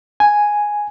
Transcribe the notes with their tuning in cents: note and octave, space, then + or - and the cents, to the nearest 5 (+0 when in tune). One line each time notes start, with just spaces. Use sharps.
G#5 +0